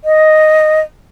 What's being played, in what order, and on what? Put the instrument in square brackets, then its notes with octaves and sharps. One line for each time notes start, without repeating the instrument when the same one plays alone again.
[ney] D#5